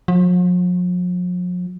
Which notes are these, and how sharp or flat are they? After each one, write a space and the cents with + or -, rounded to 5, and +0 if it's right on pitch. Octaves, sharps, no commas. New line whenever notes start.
F3 +45